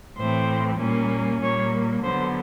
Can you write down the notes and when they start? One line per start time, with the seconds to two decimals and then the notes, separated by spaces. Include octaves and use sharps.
0.18 A2 E3 A3 C4 C5
0.80 A#2 G3 A#3 C#4
1.42 A#2 G3 A#3 C#5
2.04 D3 F#3 B3 C5